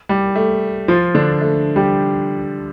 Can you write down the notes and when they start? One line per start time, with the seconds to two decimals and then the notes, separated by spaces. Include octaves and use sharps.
0.09 G3
0.35 A3
0.88 F3 F4
1.15 D3 D4
1.41 A3
1.76 G3 G4